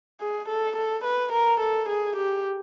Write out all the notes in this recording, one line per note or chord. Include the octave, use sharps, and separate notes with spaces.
G#4
A4
A4
B4
A#4
A4
G#4
G4